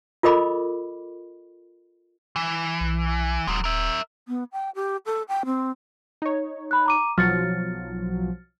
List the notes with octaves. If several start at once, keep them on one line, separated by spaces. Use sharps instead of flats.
F4 A4 A#4 D#5 B5 D6
E3
B1
D#1 F#3 G#3
A#4 E5
B3
G5
G4
A4
G5
C4
D#4 C#5
B5 F#6
A#5 D6 D#7
B1 F3 F#3 F6 A6 C#7